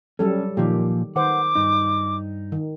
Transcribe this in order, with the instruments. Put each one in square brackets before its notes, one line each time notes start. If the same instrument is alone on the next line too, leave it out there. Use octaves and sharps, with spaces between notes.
[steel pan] F#3 G3 A4 [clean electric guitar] C#4
[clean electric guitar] A#2 F3 [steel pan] D#3 G4
[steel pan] D#3 C5 [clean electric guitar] B4 F#5 [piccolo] D6
[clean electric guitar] G2 D#4
[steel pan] D#3